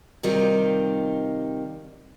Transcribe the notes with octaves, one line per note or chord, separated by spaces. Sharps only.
C3 D#3 G3 D#4 F4